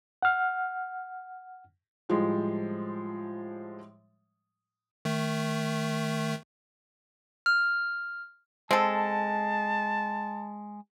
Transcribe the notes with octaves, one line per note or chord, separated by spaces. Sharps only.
F#5 F6
A2 F3 G3 G#3
D#3 A3
F6
G#3 C4 A4 A5